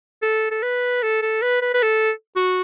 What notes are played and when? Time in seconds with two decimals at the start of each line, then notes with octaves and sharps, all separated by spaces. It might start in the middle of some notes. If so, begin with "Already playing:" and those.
0.22 A4
0.51 A4
0.63 B4
1.03 A4
1.22 A4
1.42 B4
1.62 B4
1.74 B4
1.82 A4
2.36 F#4